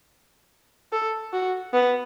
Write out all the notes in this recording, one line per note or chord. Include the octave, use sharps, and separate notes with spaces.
A4
F#4
B3